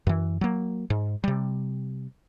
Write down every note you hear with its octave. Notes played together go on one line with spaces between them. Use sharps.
F#2 E3
F#3 A#3
G#2
C3 G3